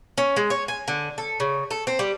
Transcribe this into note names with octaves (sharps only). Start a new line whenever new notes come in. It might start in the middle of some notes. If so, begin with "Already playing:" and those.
C#4
G#3
C#5
G#5
D3
A4
C#3
A4
C4
G3